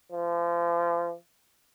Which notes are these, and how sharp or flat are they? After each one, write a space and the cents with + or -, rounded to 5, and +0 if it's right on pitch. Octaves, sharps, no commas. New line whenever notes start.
F3 -35